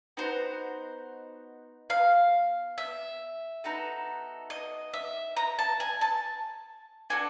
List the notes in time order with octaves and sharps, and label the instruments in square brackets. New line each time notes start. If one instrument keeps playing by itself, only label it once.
[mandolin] B3 D#4 F#4 C5
F5
E5
B3 D#4 F#4 A4
D#5
E5
A#5
A5
G#5
A5
D4 F#4 A4 G#5